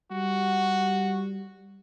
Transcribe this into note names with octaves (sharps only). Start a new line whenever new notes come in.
G3 F#4